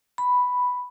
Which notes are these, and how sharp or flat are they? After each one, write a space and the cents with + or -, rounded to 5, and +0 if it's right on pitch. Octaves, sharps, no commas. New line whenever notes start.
B5 +0